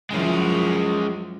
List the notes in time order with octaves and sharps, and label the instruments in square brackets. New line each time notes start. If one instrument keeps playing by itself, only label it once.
[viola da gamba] F#2 E3 F3 [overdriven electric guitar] G#3 C#4